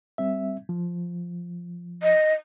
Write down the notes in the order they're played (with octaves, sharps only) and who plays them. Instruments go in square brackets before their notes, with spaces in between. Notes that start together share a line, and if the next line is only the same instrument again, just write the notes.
[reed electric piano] G3 C4 E5
F3
[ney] D#5